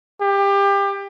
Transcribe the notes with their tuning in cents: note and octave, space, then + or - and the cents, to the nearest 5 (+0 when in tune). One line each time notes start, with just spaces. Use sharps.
G4 +25